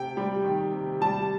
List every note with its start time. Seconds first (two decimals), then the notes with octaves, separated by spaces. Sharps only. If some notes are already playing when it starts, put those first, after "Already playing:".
Already playing: C3 G5
0.17 G3
0.44 D#3
0.72 C3
1.01 G3 A5